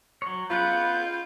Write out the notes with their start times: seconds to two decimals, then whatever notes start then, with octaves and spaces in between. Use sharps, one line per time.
0.22 F#3 C#5
0.50 B3 F4 B4 F#5 G6